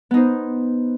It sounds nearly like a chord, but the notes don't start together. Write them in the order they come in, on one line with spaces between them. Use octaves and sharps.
B3 D#4 C5